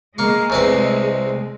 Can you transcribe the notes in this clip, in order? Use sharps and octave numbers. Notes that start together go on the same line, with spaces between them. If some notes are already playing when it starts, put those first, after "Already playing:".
G#3 A#3 C#6
C2 C4 B4